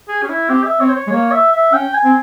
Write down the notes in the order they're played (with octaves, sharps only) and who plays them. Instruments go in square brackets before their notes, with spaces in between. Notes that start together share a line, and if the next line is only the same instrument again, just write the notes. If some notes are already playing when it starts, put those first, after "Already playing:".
[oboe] G#4
C#4
E4
[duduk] C4 [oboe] G4
[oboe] E5
[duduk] C4 [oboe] C#5
[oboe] C5
C#5
[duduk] G#3
[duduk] A#3 [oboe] C#5
[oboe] E5
E5
[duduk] C#4 [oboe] G5
[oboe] G#5
[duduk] C4